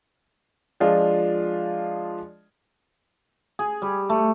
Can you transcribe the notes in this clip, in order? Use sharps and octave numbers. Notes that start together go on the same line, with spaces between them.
F3 G#3 D4 F4 G#4 D#5
G#4
G3
A3